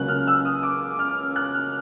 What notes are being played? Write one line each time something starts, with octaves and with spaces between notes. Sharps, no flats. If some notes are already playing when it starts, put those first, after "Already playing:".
Already playing: C#2 C#3 F#3 A#3 F#6
F6
E6
D#6
D6
F6
F#6
F6